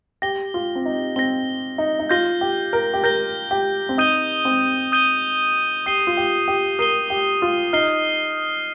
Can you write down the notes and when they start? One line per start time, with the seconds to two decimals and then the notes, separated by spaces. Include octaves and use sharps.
0.22 G4 A#6 G7
0.54 F4
0.75 C4
0.85 D#4
1.16 C4 A#6 G7
1.78 D#4
1.99 D#4
2.09 F4 G6 A#6 G7
2.41 G4
2.73 A#4
2.94 G4
3.04 A#4 G6 A#6 G7
3.51 G4
3.89 C4
3.98 D#4 D#6 G6 D#7 G7
4.45 C4
4.92 D#6 G6 D#7 G7
5.86 G4 D#6 C7 D#7 G7
6.07 F4
6.17 G4
6.48 G4
6.79 A#4 D#6 C7 D#7 G7
7.10 G4
7.42 F4
7.73 D#4 F6 C7 G7